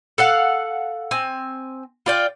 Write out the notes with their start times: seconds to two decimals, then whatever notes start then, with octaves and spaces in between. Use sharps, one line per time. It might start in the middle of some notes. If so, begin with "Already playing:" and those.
0.18 A4 F5 F#5
1.11 C4 G#5
2.06 F4 D5 G5